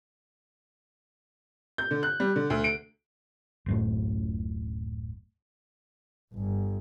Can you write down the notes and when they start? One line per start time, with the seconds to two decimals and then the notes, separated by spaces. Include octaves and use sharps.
1.78 G6
1.91 D3
2.03 F#6
2.20 G3
2.36 D3
2.50 D2
2.64 D7
3.66 D1 F#2 A2
6.34 G1